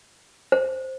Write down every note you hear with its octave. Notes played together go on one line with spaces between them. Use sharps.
C5